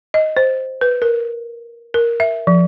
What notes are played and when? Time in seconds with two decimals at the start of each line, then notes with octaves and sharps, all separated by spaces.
0.14 D#5
0.37 C5
0.81 B4
1.02 A#4
1.94 A#4
2.20 E5
2.47 F3